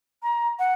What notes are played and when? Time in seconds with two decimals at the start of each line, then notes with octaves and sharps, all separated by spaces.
0.23 A#5
0.59 F#5